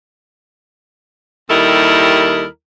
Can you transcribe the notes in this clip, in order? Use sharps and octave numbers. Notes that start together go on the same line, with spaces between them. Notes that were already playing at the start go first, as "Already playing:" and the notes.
D#2 G3 E4 A4 A#4 D#5